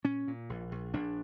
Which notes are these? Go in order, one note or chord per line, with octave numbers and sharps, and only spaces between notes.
A#2 C#4
A#2
A#1
A#1
A#1 D4